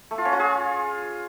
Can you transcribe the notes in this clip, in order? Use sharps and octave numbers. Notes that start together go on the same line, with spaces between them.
A3
F4
C#4
F4
G#4